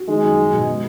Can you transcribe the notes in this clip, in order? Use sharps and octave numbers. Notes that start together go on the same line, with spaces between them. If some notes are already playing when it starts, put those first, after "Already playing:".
Already playing: F#4
D#3 G#3
F#2
F#3
B2
G#3